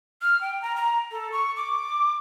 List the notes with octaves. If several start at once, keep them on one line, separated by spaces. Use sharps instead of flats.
F6
G5
A#5
A#5
A4
C#6
D6